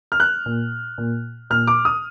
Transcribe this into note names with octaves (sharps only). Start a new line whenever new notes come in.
F6
F#6
A#2
A#2
A#2 F6
D6
D#6